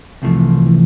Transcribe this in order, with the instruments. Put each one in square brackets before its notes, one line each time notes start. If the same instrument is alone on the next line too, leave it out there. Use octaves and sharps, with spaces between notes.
[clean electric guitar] C2 C3 F3 A3 [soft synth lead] E3
[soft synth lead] E3